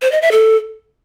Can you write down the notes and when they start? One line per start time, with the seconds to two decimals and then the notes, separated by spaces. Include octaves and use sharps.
0.02 C5
0.12 D#5
0.22 E5
0.32 A4